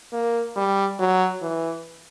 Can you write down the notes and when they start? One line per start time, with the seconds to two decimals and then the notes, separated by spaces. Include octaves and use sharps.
0.13 A#3
0.56 G3
0.99 F#3
1.42 E3